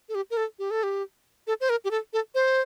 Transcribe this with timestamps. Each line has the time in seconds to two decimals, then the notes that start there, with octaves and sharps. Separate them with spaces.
0.09 A4
0.15 G4
0.31 A#4
0.37 A4
0.59 G4
0.71 A4
0.83 G4
1.47 A4
1.61 C5
1.70 A#4
1.85 G4
1.91 A4
2.13 A4
2.35 C5